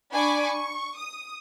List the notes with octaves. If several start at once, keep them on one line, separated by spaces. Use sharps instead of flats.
D4 G#5 B5 C#6 D6
C#6
D#6